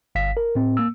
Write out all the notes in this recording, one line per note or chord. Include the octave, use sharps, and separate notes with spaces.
G1 F5 B6
A#4
A2 C4
A#3 E6